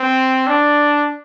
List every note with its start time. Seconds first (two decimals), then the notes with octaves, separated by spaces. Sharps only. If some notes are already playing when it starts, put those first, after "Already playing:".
Already playing: C4
0.47 D4